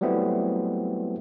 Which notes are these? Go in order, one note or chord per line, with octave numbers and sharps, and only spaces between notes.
F#3 G3 A3 B3 C4 E4